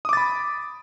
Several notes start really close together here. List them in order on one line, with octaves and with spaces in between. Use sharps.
D#6 D6 A6 B5